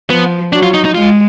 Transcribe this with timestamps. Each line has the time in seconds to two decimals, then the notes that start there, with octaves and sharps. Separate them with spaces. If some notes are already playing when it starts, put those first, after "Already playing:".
0.10 F3 B3
0.53 F#3 D4
0.63 F4
0.74 D#4
0.85 D#4
0.95 G#3 F4